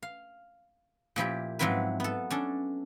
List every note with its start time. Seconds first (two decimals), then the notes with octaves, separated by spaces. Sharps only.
0.03 F5
1.16 A#2 F3 E4 G4
1.59 G#2 F3 F#3 C4 E4 B4
2.00 B3 A4
2.30 C#4 D4 A4